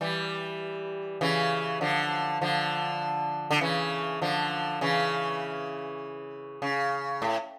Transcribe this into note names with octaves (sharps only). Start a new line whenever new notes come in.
E3 G3
C#3 E3
D3 F3
D3 F3
D3
C#3 E3
D3 F3
C#3 E3
C#3
A2